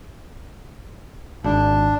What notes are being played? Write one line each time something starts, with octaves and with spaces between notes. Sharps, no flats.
G#1 D4